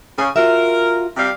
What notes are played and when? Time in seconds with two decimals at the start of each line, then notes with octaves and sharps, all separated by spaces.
0.18 C#3 G#5
0.36 F4 F#4 A#4 E5
1.17 C3 G3 F5